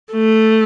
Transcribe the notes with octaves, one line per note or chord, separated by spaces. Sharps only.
A3